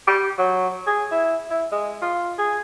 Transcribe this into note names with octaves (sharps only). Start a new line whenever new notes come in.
G4
F#3
G#4
E4
E4
G#3
F4
G#4